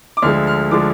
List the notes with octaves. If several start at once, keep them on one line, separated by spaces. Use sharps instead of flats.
D6
D2 D3 F3 G#3 F6
F6
D3 F3 G#3 D6